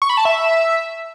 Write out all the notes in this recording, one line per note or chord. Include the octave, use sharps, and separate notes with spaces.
C#6
B5
A5
E5